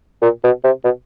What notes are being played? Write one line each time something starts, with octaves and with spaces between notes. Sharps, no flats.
A#2
B2
C3
B2